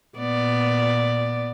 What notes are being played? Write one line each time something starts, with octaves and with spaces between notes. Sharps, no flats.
A#2 B3 D5